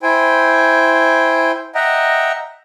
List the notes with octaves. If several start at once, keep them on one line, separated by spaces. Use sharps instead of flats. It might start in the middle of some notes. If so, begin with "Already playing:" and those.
E4 C5 G5 G#5
D#5 E5 F#5 G5 A#5